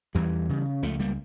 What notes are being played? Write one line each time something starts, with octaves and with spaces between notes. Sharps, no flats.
E2 E3 G3
C#3
C#2 F3 A3
G3 A#3